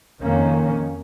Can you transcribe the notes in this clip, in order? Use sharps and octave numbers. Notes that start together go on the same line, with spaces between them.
F2 D#3 A#3 C#4